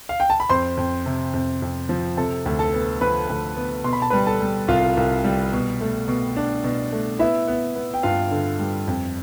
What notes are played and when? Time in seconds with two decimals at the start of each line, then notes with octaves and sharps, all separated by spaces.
0.09 F5
0.20 G5
0.30 A5
0.40 B5
0.50 F2 C5 C6
0.77 F2
1.06 C3
1.34 F2
1.62 F2
1.89 F3
2.17 C3 A4 A5
2.46 D2
2.59 A4 A5
2.74 B3
3.01 F3 B4 B5
3.29 D2
3.57 B3
3.84 B2 C6
3.93 B5
4.02 A5
4.10 B4 B5
4.13 G3
4.27 A4 A5
4.41 G3
4.68 C2 F4 F5
4.97 C2
5.24 G3
5.53 B2
5.81 A3
6.08 B2
6.37 D4
6.64 B2
6.92 A3
7.19 B3 E4 E5
7.48 B3
7.76 B3
7.94 G5
8.03 G2 F4 F5
8.31 D3
8.59 G3
8.87 F2